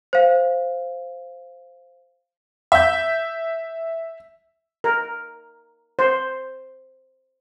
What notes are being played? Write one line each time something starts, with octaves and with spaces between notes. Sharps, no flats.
C5 F5
E5 G6
A#4
C5